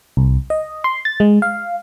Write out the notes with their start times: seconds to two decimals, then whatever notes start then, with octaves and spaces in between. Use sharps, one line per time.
0.17 C2
0.50 D#5
0.84 C6
1.05 A6
1.20 G#3
1.42 F5